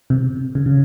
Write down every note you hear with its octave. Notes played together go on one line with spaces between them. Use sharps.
C3
C#3
C#3